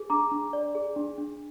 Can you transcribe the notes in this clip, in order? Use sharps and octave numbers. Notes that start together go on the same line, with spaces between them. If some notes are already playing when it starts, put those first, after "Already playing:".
Already playing: G#4
D4 A#5 D6
D4
D5
G#4
D4
D4